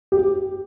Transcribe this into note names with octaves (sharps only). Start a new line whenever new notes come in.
G4